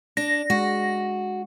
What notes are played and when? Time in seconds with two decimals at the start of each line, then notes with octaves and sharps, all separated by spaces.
0.17 D4 A#6
0.50 G#3 F#4